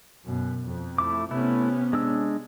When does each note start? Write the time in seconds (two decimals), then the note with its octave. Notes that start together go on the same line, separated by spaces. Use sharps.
0.23 F#2 B2
0.64 F2
0.98 A3 E4 D6
1.31 C3 A3 B3 C#4 E4
1.93 G#3 D4 E6